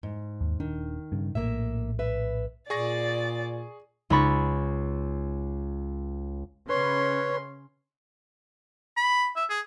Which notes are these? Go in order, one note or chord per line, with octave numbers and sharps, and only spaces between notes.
G#2
D#2
D#1 D#3 D4
G2 C#3
A#1 A2 A#3 E5
B4 E5
A#2 G#4 D5 C#6 A6 A#6
C#2 D#4 B5 C#6 A6
C#3 C#4 B4 C#5 C6
B5
E5
G#4